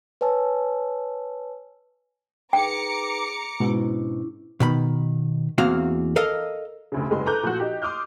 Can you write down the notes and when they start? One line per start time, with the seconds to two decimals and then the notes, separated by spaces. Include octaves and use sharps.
0.21 B4 C#5 G#5 A5 E6
2.53 D#4 G#4 B4 G5 A#5 D6 C#7
3.60 G#2 B2 C#4 D4 E4
4.60 B2 D#3 B5
5.58 E2 A#3 C4 F#4 F5
6.16 A4 A#4 D#5 F5
6.92 F1 D2 C#3
7.10 F#1 G2 G#3 G4 C6
7.26 A4 B4 A#5 D6 F#6 G6
7.43 A#2 F3 F#4
7.60 D#4 G4
7.82 C6 D6 D#6 F6 G6